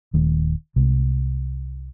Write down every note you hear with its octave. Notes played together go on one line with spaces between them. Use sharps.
D#1 D#3 A3
C2 C3 G#3